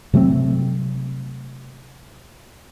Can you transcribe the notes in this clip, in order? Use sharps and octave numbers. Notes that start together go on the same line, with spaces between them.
C3 F#3 A3 C4